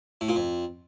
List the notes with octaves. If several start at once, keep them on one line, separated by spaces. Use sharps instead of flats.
A2
A#2
F2